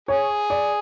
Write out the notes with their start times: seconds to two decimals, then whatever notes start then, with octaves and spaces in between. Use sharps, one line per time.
0.08 G#4 C#5
0.50 D5